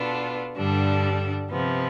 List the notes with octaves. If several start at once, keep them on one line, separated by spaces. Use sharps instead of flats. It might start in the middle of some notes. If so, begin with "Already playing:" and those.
Already playing: B2 B3 D4 F4 A4
G2 D3 G3 D4 A4
C3 F3 B3